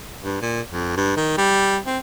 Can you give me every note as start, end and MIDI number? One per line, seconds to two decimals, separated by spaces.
0.23 0.39 43
0.42 0.61 46
0.70 0.96 41
0.97 1.13 43
1.17 1.34 51
1.37 1.78 55
1.86 1.98 60